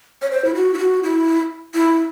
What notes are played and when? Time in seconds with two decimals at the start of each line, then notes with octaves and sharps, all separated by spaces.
0.22 C#5
0.31 C5
0.45 E4
0.55 F#4
0.74 E4
0.78 F#4
1.03 E4
1.74 E4